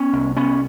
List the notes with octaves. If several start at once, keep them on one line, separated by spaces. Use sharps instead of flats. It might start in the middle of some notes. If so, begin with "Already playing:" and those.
Already playing: B3 C#4
C2
C2 B3 C#4